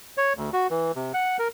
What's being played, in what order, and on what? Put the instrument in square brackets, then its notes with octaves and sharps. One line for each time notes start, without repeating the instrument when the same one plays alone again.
[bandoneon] C#5
D2
F#4
E3
C3
F#5
A#4